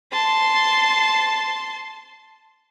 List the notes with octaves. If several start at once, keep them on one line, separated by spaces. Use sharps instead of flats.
A5 C6